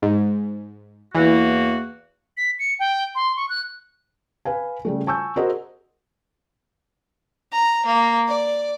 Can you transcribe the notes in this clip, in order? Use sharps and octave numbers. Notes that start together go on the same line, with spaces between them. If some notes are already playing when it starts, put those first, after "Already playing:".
G#2
E2 E3 A#3 F#4
B6
C#7
G5
C6
C#6
F#6
B4 F5 G#5
C#3 G3 A3
G#5 A5 C#6 E6 G6
F#4 G#4 A#4 C5 D#5
A#5
A#3
D5